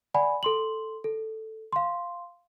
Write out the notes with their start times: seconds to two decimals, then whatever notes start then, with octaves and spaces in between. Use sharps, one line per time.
0.14 D5 F#5 G#5 B5
0.43 A4 C6 F#7
1.04 A4
1.73 F5 C6